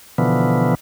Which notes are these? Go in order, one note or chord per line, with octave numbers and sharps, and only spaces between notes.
B2 D3 E3 F3 B3